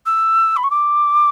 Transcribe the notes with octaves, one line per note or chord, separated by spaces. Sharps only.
E6
B5
C#6
D6